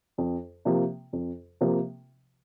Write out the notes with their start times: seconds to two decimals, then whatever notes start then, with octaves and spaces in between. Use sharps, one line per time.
0.18 F2
0.65 C3 F3 A#3
1.13 F2
1.61 C3 F3 A#3